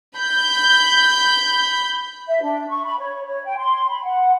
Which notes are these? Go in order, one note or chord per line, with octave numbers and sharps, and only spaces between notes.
B5 G6
E5
D4
C#6
B5
C#5
C#5
G5
C6
B5
F#5